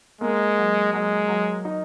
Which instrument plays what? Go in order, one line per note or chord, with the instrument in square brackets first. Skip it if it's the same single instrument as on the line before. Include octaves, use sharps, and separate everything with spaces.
[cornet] G#3 [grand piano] A#3
[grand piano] F#3
[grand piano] F#3 [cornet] G#3
[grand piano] F#3
D#4